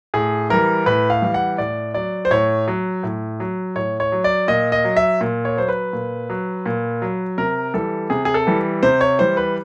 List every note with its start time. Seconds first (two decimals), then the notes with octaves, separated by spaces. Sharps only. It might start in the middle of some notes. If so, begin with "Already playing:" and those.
0.14 A2 G#4
0.50 E3 G3 A#4
0.86 A2 B4
1.10 F5
1.22 E3 G3
1.34 F#5
1.58 A2 D5
1.94 F#3 D5
2.25 C5
2.31 A2 C#5
2.68 F#3
3.03 A2
3.40 F#3
3.76 A2 C#5
4.00 C#5
4.12 F#3
4.24 D5
4.48 A#2 D#5
4.72 D#5
4.85 F#3
4.97 E5
5.21 A#2
5.45 C#5
5.57 F#3 C5
5.69 B4
5.93 A#2
6.30 F#3
6.66 A#2
7.02 F#3
7.38 C3 A#4
7.74 E3 G3 A4
8.10 C3 G#4
8.25 G#4
8.34 A4
8.47 E3 G3
8.83 C3 C5
9.01 C#5
9.19 E3 G3 C5
9.37 B4